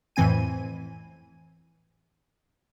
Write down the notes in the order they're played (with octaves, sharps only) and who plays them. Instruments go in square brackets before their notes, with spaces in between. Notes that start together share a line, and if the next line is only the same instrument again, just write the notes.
[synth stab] F2 A2 E3 C4 G#5 D#7